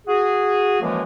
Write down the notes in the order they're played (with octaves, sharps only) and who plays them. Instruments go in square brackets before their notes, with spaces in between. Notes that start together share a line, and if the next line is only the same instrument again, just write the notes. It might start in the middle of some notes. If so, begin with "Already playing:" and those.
[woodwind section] F#4 G#4
F#2 A2 E3 F3 G#3 A#3